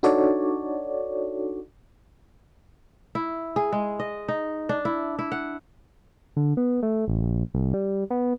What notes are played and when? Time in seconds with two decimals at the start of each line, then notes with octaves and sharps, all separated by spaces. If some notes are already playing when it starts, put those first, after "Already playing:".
0.03 D4 D#4 F#4 A4 C#5 D5
3.15 E4
3.56 G#4
3.72 G#3
4.00 D#5
4.28 D#4
4.69 D4
4.85 E4
5.19 E4
5.32 F#5
6.36 D3
6.57 B3
6.83 A3
7.08 A1
7.22 A#1
7.54 C2
7.74 G3
8.10 B3